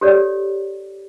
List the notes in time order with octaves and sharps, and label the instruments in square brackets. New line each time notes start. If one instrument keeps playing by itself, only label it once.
[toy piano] G4 A4 C#5 D5